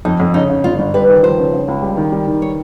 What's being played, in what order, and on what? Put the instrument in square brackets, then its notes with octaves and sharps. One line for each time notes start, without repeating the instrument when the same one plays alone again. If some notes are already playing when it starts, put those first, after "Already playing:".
[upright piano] F2 [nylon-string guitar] D#4
[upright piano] F2
[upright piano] C#3 [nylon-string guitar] D#4
[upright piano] C#3
[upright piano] G1 [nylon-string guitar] F4
[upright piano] G1
[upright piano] G3 [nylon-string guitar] B4
[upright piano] D#3
[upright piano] F3 [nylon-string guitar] C5
[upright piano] C#3
C#3
C#2
G3
D#3
G3
D#3
[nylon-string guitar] C#5